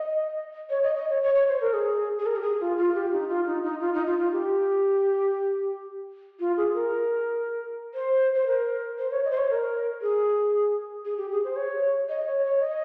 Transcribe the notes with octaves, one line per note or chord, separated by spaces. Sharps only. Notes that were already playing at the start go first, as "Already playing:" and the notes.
Already playing: D#5
C#5
D#5
D#5
C#5
C#5
C#5
C5
A#4
G#4
G#4
A#4
G4
G#4
F4
F4
G4
D#4
F4
D#4
D#4
F4
D#4
F4
F4
G4
F4
G#4
A#4
C5
C5
A#4
C5
C#5
D#5
C5
C#5
A#4
G#4
G#4
G4
G#4
C5
C#5
D#5
C#5
C#5
D#5